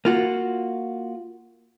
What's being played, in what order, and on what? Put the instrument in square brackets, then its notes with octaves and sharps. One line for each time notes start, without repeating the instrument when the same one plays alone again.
[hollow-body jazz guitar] A#3 F4 F#4